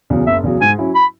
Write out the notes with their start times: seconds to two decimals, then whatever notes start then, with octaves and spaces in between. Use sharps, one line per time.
0.10 E2 C#3 F#3
0.27 F#1 E5
0.44 E2 C#3 F#3
0.61 G#2 G#5
0.78 F#3 C#4 E4
0.95 B5